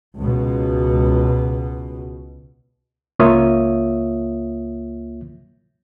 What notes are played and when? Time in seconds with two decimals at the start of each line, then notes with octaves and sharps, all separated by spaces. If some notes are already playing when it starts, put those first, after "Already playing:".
0.19 C#2 B2
3.19 C#2 A#3 F4 C#5 E5 D#6